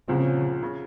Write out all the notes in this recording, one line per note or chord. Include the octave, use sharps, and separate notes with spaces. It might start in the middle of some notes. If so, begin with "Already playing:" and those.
C2 A#2 C#3 F3 C4
C#3